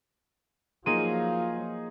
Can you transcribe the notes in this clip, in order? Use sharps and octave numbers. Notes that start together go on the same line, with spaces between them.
F3 F#3 A#3 D#4 F4 G#4 C6 D#7